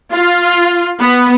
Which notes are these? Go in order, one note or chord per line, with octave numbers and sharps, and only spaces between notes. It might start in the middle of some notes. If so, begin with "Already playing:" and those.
F4
B3